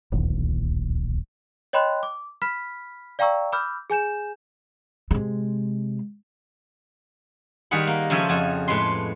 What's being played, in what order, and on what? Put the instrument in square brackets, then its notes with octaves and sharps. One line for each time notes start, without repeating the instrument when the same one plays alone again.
[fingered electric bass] D1 A#1 D#2
[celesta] C#5 D#5 G5 B5 C6 F#6
D6
B5 F6 B6
D5 F5 G5 A#5 C#6 E6
B5 D6 E6 F6 G6
G#4 G#5 G6 E7
[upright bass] C3 G#3
[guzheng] D#3 G3 G#4 F#5 B5
A#3
C#3 F3 A4 E5 G#5
F2 F#4 G#5
A2 G#3 B4 C6